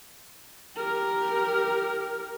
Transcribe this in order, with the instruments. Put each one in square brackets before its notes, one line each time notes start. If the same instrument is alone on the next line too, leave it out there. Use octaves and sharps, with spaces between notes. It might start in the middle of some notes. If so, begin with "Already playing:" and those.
[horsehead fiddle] G4 A#4